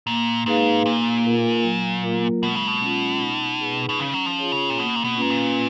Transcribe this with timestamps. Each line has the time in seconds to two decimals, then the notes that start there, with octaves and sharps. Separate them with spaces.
0.07 A#2 A#3
0.46 G#2 D#4 G#4 B4 F5
0.85 A#2 A#3
1.25 F4 A#4
1.63 F#3
2.04 A#3 F4 A#4
2.43 B2 G#3
2.55 C#3
2.67 B2
2.82 C#4 F4
3.20 D#4
3.60 G#4 B4
3.89 B2
3.99 C#3 C#4
4.14 F#3
4.26 F3
4.39 F4 G#4 C#5
4.52 C#3
4.70 A#2
4.78 B2 A#3
4.96 A#2
5.04 B2
5.17 G#2 C#4 F4 B4
5.30 A#2